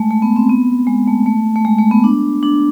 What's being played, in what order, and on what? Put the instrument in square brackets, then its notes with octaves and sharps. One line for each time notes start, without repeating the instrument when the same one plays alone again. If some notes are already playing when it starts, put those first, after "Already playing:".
Already playing: [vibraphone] G#3 A3
A3
B3
C4
B3
G#3
A3
A3
A3
G#3
A3
B3
D4
D4